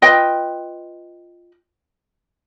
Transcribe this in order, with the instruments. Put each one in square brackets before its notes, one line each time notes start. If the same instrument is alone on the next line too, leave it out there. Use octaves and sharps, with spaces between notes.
[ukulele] F4 B4 D#5 G5